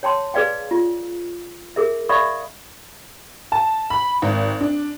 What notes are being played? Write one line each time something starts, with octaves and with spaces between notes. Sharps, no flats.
C#5 G5 A5 C6
G#4 B4 D5 F5 G5
F4
G#4 A#4 E5
D5 E5 F5 B5 C#6 D#6
A5
B5
G#1
D4